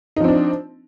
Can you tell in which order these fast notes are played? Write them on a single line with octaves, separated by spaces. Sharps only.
D#4 F3 C4 D4